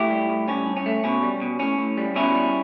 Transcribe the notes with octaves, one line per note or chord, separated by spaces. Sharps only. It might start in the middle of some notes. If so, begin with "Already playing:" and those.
Already playing: A2 E4 G4
G3
A2
G2 C#4
G2
C#4
A3
B2 C#4
G3
B2
A2 C#4
A2
G3
B2 C#4 E4
G3